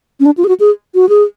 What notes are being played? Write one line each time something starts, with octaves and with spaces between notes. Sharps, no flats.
C#4
D4
F4
G#4
F#4
G#4
F#4
G#4